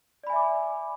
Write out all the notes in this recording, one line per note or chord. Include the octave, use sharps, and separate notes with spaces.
D5 E5 G#5 B5 D6